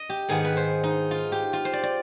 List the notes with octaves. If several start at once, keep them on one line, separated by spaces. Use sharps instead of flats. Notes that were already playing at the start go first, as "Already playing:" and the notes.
Already playing: D#5
G4
G#2 D#3 B3 G#4
B4
C5
D#4
F4
G4
F4
C5
D5
D5